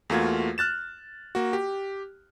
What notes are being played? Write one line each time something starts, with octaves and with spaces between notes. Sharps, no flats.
E2 A3 A#3 F4 F#4 G#6
F6 F#6 A6 E7
A#3 F#4
G4